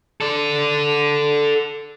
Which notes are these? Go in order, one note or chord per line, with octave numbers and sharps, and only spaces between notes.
A4 D5